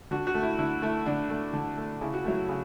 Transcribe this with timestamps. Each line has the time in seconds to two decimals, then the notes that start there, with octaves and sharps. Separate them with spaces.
0.11 D3 F#4
0.27 F#4
0.34 A3
0.43 E4
0.59 D3 E4
0.82 A3 E4
1.06 D3 D4
1.30 A3
1.53 D3
1.78 A3
2.01 C#3 E4
2.14 F#4
2.24 F#3 A3 E4
2.49 C#3